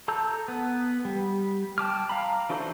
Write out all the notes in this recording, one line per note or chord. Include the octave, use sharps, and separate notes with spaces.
A4 A5 A#5 E6 G6
B3
G3
G5 A5 D6 F6
F5 A#5 B5
E3 D4 F#4 A4 C5